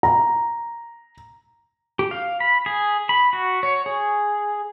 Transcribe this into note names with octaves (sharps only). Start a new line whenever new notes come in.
A#5
G4
F5
B5
G#4
B5
F#4
C#5
G#4